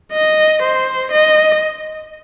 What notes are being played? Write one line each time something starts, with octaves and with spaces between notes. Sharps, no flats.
D#5
C5
D#5